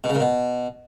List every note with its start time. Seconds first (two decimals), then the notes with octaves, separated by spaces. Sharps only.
0.04 B2
0.09 C#3
0.15 A#2
0.20 B2